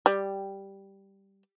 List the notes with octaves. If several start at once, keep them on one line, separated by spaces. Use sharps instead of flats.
G3